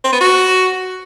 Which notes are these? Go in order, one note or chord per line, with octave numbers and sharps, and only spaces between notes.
C4
B3
F#4